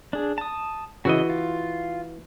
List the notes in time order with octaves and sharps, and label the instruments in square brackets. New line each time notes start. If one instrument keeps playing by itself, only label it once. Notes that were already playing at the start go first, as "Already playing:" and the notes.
[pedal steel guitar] D4 G#4
A5 D#6
[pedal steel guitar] C#3 D#5 [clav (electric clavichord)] E3 F#4
[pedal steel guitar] F4